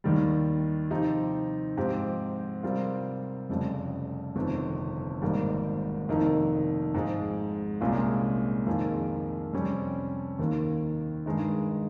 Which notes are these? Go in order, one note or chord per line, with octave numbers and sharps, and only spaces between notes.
D#2 D#3 G3
C3 F3 C4 D#4 G4
G#2 F3 C4 G4
C3 G3 C4 F4 A#4
F1 F2 C#3 G3
G1 F2 C3 D#3
G#1 G#2 G3 A#3
F1 F2 D#3 A#3 D#4
G#2 F3 G#3
C2 A#2 G#3 C#4 F4
F2 D#3 A#3 F4 G#4
F2 C3 G3 C#4
D#2 D#3 A#3
G2 D#3 G#3 D#4